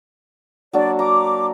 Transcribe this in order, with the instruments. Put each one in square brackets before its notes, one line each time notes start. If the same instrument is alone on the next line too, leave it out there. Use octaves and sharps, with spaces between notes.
[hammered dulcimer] F#3 A#3 D4 [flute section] D5
[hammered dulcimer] A#5 [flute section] D6